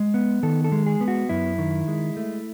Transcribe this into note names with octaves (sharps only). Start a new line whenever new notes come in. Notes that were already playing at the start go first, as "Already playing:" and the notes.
Already playing: G#3
B3
D#3 A4
A4
G#3
G#4
B3
F#4
F#2 E4
D#3
G#3
A3